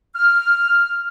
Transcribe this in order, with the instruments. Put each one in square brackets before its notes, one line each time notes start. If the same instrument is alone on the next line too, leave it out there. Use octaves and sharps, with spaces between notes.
[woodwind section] F6